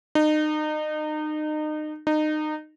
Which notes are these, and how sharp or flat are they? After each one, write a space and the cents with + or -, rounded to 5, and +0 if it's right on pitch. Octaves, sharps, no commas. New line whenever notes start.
D#4 -30
D#4 -25